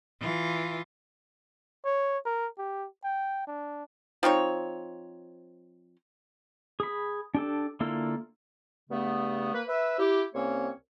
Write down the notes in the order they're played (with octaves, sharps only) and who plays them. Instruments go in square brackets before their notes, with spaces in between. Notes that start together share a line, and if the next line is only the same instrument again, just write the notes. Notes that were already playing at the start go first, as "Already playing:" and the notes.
[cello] E3 F4
[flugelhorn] C#5
A#4
G4
G5
D4
[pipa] F3 C4 D#4 C#5
[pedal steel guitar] G#4 B5
D4 G4 A4
D3 A#3 E4 F4 A4
[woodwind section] G2 C#3 A3 B3
A#3 B4
B4 E5
E4 G4
C2 A#3 C4 C#4 C#5